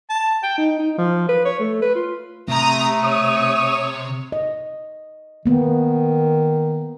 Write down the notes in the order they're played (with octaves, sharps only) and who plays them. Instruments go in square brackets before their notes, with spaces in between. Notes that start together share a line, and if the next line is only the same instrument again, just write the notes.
[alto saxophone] A5
G5
D#4
D#4
F3
B4
C#5
A3
B4
F4
[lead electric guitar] C3 [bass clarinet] A3 [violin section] A#5 D#6
[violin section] C#5 [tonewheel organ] D#6
[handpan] D#5
[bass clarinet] D#3 [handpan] A#3 B3